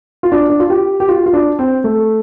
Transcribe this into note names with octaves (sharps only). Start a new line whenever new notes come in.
F4
D4
D4
F4
G4
G4
F4
F4
D4
C4
A3